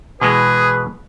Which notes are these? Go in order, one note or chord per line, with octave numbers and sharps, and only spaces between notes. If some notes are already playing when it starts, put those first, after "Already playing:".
B2 E3 G#3 G#4 B4